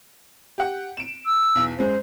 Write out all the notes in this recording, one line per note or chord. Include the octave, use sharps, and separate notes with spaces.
G4 F#5
D7 E7
E6
B1 E2
F#2 G#3 C5